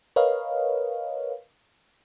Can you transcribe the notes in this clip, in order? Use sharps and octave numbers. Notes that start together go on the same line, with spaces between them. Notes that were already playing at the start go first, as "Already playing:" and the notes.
A#4 B4 C#5 D#5 F5